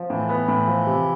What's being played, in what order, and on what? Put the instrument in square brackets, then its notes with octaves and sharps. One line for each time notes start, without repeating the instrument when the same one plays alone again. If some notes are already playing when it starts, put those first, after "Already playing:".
Already playing: [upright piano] F3
[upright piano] A2 [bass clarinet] E3
[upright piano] B3
A2
F3
C3